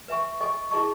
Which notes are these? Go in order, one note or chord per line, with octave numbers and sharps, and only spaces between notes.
B4 E5 G#5 C#6
A4 D#5 G#5 C#6
E4 G#4 D#5 A5 C#6